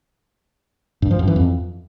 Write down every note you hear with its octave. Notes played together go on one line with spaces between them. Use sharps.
G2
F3
F#2
E3
F2